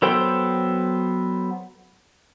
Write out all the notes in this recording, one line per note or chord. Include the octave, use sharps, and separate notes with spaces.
F#3 B3 A4 C5 G5